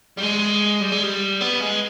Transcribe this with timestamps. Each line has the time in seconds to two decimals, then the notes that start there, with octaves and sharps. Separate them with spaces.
0.18 G3
0.23 G#3
0.82 G3
0.92 G#3
1.03 G3
1.41 B3
1.60 G#3